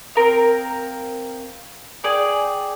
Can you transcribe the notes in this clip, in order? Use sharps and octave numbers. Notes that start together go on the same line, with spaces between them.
C4 A#4 F5
G#4 D5 G5